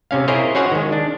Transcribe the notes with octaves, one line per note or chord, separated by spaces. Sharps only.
C3 C#4 F5
E4 G#4 A#4 C5 C#5 D#5
C#4 F#4 C5 C#5 F#5 G#5
D#3 G#3
D4